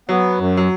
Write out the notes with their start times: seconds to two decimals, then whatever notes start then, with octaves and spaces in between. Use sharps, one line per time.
0.09 F#3 B3
0.39 F#2
0.57 F#3